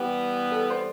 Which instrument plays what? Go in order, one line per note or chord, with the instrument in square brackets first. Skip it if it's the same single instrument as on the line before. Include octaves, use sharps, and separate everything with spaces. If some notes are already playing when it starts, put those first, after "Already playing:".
Already playing: [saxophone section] E3 G3 B3 [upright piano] G4
[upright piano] A4
D5
C5